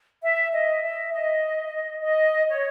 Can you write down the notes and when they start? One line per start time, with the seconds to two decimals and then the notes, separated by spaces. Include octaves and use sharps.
0.21 E5
0.52 D#5
0.83 E5
1.12 D#5
2.03 D#5
2.49 C#5